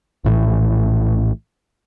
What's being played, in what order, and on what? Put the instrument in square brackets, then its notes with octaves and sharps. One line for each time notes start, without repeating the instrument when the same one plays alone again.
[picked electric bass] A#1 A2 D#3 E3